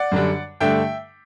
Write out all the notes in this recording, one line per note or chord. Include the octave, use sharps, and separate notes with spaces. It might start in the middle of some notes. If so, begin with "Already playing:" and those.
Already playing: D5 F#5
F#2 D3 G3 D4
G2 D3 A3 D4 E5 G5